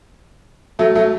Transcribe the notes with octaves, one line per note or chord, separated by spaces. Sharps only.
F#3 A3
F#3 A3